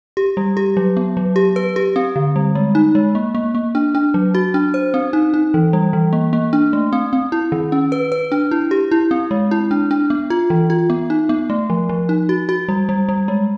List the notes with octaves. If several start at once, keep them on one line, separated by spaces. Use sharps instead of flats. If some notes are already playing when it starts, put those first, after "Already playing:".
G4
G3
G4
F#3
B3
F#3
G4
B4
G4
C4
D3
G3
G#3
D#4
G#3
A#3
A#3
A#3
D4
D4
F#3
F#4
D4
C5
C4
D#4
D#4
E3
G3
E3
A#3
A#3
D4
A3
C4
C4
E4
D#3
C#4
B4
B4
D4
E4
G4
E4
C4
G#3
E4
D4
D4
B3
F4
E3
F4
B3
D#4
B3
A3
F3
F3
D#4
F#4
F#4
G3
G3
G3
G#3